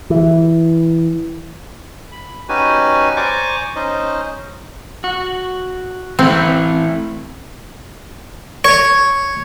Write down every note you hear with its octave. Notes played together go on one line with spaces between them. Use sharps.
E3
B5
C#4 D#4 F#4 G4 B4 G#5
C5 D5 G#5 A#5 C#6 D6
C#4 D#4 C5 D#5
F#4
E3 A3 C4 E4
C#5